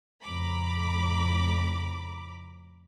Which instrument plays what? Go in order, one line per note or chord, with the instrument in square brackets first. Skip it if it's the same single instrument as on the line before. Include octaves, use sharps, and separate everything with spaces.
[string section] F2 A2 C#3 A#5 B5 D6